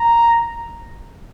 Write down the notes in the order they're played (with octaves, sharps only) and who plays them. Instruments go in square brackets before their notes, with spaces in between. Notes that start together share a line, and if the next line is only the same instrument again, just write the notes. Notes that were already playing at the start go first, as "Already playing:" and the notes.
Already playing: [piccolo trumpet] A#5